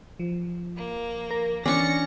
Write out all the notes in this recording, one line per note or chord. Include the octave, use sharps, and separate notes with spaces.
F3
A#3
A#4
E3 C#4 D4 C#6 A6 A#6 C#7